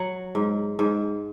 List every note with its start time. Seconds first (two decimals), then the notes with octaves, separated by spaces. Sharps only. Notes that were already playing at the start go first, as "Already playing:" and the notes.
Already playing: F#3 F#5
0.35 G#2
0.79 G#2